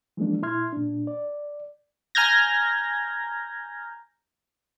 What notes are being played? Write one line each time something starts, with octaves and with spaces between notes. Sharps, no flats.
E3 F3 G#3 A#3 D4
A#2 E4 E5 C6 F6 G#6
A#2 D4
D5
G#5 A#5 F6 G6 G#6 A#6